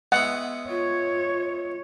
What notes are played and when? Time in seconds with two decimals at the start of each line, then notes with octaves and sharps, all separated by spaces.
0.12 G#3 B3 E4 F#5
0.69 F4 C#5